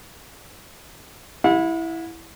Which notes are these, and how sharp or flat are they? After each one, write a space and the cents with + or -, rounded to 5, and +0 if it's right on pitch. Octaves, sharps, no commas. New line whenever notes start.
E4 +0 F#5 -40